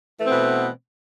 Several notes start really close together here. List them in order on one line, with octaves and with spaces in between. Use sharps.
A3 E3 C4 B3 B2